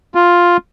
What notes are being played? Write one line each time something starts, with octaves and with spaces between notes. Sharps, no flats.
F4